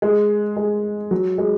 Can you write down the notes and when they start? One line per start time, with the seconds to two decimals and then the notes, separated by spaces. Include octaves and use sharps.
0.02 G#3
0.56 G#3
1.11 F#3
1.38 G#3